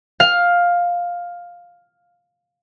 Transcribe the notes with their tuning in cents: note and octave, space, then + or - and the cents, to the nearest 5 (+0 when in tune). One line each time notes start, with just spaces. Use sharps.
F5 +10